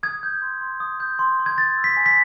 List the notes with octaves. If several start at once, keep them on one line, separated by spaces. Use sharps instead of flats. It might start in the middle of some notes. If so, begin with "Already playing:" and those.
D#6 G#6
G6
C6
C6
D#6
G6
C6
C6
G#6
C6 A6
E6
B6
G#5
B6